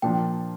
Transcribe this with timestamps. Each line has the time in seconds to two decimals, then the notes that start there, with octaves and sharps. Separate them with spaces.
0.02 A#2 F3 A#3 D4 G5